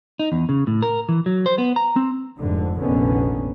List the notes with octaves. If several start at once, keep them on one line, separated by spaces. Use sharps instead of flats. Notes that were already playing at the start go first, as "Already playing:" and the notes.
D#4
E2
C#3
A2
A#4
E3
F#3
C5
B3
A#5
C4
F1 F2 G#2 D3
F1 A#1 D3 D#3 B3 C#4